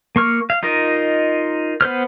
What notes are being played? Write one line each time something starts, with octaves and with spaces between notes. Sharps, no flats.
A#3 C#6 F6
F5
D#4 F4 A#4 D#5
B3 B4 C5 F6